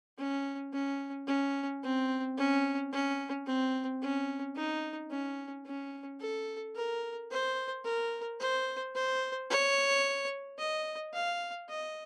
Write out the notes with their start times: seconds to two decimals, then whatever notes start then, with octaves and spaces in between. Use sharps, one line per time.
0.18 C#4
0.73 C#4
1.27 C#4
1.83 C4
2.37 C#4
2.92 C#4
3.46 C4
4.02 C#4
4.56 D#4
5.11 C#4
5.66 C#4
6.20 A4
6.75 A#4
7.31 C5
7.84 A#4
8.40 C5
8.95 C5
9.50 C#5
10.58 D#5
11.14 F5
11.69 D#5